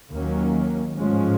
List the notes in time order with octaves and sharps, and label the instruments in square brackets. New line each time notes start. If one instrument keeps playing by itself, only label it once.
[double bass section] D#2 D#3 F#3 A#3 C#4
A1 G#2 F3 G#3 C#4